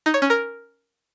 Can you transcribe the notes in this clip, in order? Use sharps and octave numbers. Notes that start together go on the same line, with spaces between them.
D#4
C#5
C#4
A#4